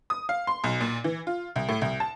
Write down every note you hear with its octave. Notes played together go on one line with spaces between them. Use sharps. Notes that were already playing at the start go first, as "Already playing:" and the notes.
D#6
F5
C6
B1
A#2
E3
F4
C2
A2
C2
A5